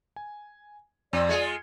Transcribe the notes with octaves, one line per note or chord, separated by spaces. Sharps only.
G#5
F2 C4 D5 D6
G#3 F4 G#4 G#6 C#7